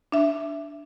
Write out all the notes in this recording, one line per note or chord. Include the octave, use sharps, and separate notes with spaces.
D4 E5